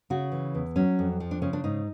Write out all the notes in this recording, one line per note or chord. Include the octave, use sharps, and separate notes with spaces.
C#3 F#4
E3
E2
F#3 C#4
F2
F3
D4
C#3 C#4
D4
G#2 D#4